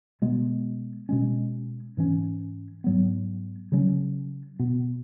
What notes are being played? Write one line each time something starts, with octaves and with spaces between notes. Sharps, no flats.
B2 G#3 B3
B2 G#3 C#4
G#2 E3 C#4
G#2 F#3 B3
C#3 F#3 C#4
B2 B3